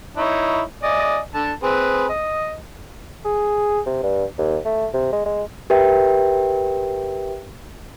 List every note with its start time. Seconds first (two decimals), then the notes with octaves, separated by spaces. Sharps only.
0.17 D#4 E4 C#5
0.83 D5 D#5 G#5
1.34 D3 A5
1.63 C4 G#4 B4
2.09 D#5
3.25 G#4
3.86 C3
4.03 G2
4.38 D#2
4.65 A3
4.94 C3
5.12 G#3
5.26 G#3
5.70 G4 A#4 B4 E5 G5